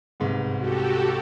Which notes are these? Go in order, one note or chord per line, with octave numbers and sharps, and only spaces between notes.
C2 G#2 B3
F#4 G4 A4